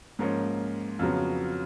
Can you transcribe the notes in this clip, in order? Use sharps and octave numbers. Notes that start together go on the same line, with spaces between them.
G#2 F3 A#3 C#4
F2 C#3 F#3 B3